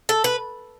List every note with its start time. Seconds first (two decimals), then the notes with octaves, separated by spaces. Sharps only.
0.09 A4
0.24 B4